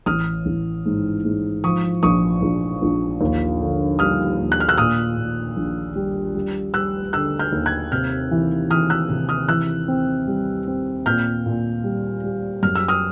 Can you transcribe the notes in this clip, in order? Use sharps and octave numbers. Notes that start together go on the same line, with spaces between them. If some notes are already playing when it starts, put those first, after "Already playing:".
A1 D#6 F6
A1
G#2
G#2
F3 C#6 D#6
A#1 C#6 D#6
A#1
A#1
D#2
D3
G3 D#6 F6
D#2
F#6
F6
E6 F#6
A#2 D#6 F6
A#2
A#1
G3
G3
G3 E6 F#6
D3 E6 F#6
F6 G6
D#2
F#6 G#6
C3 F6 G6
E3
E3 D#6 F6
E6 F#6
C3
D#6 F6
E3 E6 F#6
C4
G3
C4
A#2 F6 G6
A#2
G3
G3
F#2 F6
E6
D#6 F6